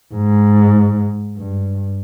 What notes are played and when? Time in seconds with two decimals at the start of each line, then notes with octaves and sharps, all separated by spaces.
0.15 G#2
1.37 G2